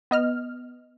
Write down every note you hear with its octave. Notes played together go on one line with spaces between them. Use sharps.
B3 D#5 F6